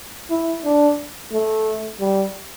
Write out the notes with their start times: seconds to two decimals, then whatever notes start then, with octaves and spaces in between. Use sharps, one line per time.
0.30 E4
0.64 D4
1.32 A3
2.00 G3